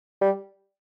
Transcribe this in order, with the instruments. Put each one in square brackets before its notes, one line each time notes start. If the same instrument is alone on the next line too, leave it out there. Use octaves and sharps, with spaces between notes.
[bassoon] G3